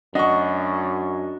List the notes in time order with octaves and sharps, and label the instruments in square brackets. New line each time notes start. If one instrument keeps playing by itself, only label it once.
[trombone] F#2 [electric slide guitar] D4 F#4 [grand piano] D#5 C#6